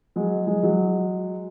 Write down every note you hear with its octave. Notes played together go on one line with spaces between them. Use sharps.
F#3 G#3
F#3 G#3
F#3 G#3